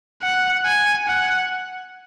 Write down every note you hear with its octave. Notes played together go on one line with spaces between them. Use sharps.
F#5
G#5
F#5